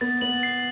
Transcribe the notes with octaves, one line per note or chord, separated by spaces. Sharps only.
B3 A6
B3 F#7
C7